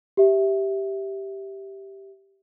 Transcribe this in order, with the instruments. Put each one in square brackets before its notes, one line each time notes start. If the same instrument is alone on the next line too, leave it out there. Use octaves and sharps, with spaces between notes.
[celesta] G4 E5